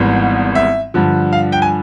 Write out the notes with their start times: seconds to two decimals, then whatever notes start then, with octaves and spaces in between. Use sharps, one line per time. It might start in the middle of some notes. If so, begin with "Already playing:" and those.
Already playing: G#1 G#2 E3 G3 B3
0.55 E5
0.94 G2 D3 F3
1.33 F5
1.52 G5
1.62 G#5